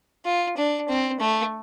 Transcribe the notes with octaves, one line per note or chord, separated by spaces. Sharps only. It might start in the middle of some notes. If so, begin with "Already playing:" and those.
F4
D4
C4
A3